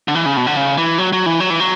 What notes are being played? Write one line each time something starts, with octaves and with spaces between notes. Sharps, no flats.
D3
E3
C#3
B2
D3
C#3
E3
F#3
F#3
E3
F#3
E3
F#3